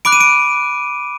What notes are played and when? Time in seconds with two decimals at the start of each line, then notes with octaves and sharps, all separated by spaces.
0.05 B5 D6 F#6 D7
0.12 D#7
0.21 D7